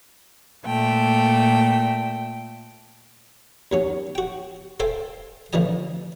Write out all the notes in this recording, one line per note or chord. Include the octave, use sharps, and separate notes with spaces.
A#2 A3 G5
D#2 F#3 C#4
F#4 G5
A4 C5 E5 F5 G5 G#5
A2 D3 E3 F3 D#5 G#5